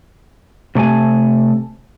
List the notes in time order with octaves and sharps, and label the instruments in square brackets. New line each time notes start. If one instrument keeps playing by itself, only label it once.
[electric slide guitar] C3 A3 D5 G#5